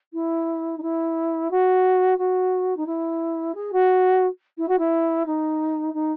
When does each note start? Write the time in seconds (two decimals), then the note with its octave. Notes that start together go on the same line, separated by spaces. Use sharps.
0.13 E4
0.77 D#4
0.82 E4
1.50 F#4
2.18 F#4
2.76 D#4
2.86 E4
3.54 G#4
3.72 F#4
4.57 E4
4.68 F#4
4.78 E4
5.25 D#4
5.93 D#4